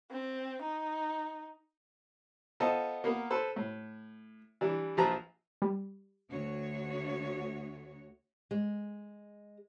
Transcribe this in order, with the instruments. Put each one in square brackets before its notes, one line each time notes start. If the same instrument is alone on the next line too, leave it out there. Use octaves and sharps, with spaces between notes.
[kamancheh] C4
D#4
[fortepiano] B3 F4 A4 C5 D#5 A5
A#3 B3 A#4
A4 B4 C5
A2
E3 G3 D4
A#1 F3 G#4 B4 A5 A#5
[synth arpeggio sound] G3
[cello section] D2 F#4 C#5
[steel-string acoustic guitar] G#3